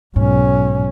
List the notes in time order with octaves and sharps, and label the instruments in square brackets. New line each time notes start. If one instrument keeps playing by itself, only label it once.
[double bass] B1 C#4 [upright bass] G#2